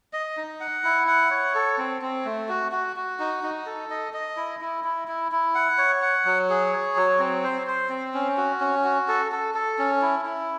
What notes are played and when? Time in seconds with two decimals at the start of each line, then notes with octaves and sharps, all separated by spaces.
0.13 D#5
0.37 D#4
0.60 F#5
0.84 E4
1.07 F#5
1.31 C#5
1.55 A4
1.78 C4
2.02 C4
2.25 A3
2.49 F#4
2.72 F#4
2.96 F#4
3.19 D#4
3.43 D#4
3.66 A4
3.90 D#5
4.14 D#5
4.37 E4
4.61 E4
4.84 E4
5.08 E4
5.32 E4
5.55 F#5
5.78 C#5
6.02 F#5
6.25 F#3
6.50 G#4
6.72 C#5
6.96 F#3
7.19 C4
7.43 C5
7.67 C5
7.90 C4
8.14 C#4
8.37 F#4
8.61 C#4
8.84 F#4
9.08 A4
9.32 A4
9.55 A4
9.79 C#4
10.02 E4
10.25 E4